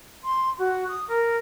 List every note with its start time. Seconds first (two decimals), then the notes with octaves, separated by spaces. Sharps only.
0.24 C6
0.59 F#4
0.88 D#6
1.08 A#4